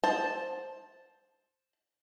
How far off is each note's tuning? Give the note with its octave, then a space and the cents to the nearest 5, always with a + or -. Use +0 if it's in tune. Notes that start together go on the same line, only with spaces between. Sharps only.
C5 +10 A5 +0